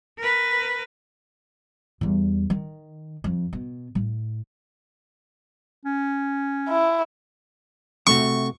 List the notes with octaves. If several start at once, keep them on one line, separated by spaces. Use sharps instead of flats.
A#4 B4
E2 G3
D#3
F2
B2
A2
C#4
E4
C3 A3 F#4 C#6